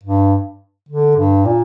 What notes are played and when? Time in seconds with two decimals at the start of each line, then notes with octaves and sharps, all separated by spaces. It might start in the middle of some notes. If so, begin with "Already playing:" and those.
0.04 G2
0.89 D3
1.17 G2
1.45 A#2